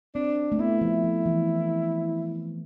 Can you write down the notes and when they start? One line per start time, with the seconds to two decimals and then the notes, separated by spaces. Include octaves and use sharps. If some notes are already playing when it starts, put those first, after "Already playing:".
0.15 C4 D4
0.52 A3
0.59 B3 E4
0.81 F3
1.04 F3
1.25 E3